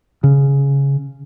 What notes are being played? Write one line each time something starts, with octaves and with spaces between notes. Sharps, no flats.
C#3